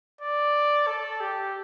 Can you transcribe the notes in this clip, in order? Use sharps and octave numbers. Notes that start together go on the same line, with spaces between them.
D5
A4
G4